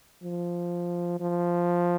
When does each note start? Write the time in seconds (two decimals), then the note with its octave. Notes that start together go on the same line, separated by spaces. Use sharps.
0.23 F3
1.20 F3